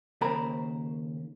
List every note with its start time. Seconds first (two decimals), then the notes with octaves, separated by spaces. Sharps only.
0.21 D#2 C#3 A#4 C5 A#5 B5